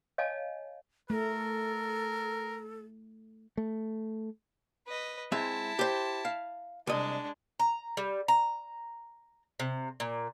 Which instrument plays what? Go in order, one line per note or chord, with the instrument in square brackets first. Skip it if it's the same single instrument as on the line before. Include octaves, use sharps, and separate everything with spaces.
[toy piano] C#5 D#5 F5 G#5 A5
[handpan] A3 [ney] A4 [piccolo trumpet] A#4
[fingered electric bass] A3
[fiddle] B4 D#5
[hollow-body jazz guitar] G#3 C4 E5 [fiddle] E4 A5
[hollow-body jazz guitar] G4 C5
F5
[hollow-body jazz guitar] C2 D#5 [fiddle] G#3 D4
[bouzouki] A#5
G3
A#5
C3
A#2